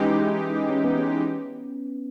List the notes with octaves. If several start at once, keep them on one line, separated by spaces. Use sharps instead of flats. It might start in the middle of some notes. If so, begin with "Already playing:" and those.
Already playing: E3 G#3 C#4 D#4 G4
C#4
B3
C#4